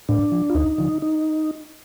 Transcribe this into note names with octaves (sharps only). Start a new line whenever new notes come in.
A2 D4
F3
F4
D2 D#4
D3 F3
D#4